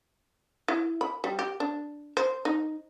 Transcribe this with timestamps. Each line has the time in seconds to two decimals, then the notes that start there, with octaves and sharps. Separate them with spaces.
0.68 E4
1.01 B5
1.24 G3
1.39 G4
1.60 D4
2.17 C5
2.45 D#4